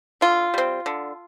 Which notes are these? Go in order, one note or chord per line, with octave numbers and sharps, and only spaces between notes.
D3 F4
G3 C4
D3